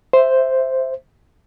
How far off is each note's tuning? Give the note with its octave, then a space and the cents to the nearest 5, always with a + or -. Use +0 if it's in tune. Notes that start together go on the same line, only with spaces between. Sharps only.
C5 +0 E5 +0